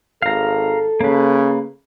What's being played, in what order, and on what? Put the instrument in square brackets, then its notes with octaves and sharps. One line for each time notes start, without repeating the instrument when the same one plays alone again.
[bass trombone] G#1 [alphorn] A4 [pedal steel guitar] F5 A#5
[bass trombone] C#3 [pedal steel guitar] A#3 B4